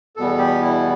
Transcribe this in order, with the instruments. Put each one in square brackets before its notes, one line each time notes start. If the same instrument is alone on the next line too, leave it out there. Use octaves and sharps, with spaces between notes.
[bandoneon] E2 B2 G3 B3 A4
G4
E4